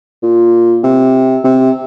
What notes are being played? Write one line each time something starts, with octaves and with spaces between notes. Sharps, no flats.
A#2
C3
C3